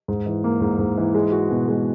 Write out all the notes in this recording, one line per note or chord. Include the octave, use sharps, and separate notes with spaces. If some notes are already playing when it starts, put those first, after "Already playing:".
G#2
E3
A#3
G#2
G#2
E3
G#3
F#4
B2
G#3